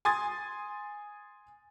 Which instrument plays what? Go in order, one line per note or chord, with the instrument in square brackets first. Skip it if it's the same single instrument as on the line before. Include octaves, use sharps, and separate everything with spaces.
[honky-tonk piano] G#5 C6 D#6 G#6 A6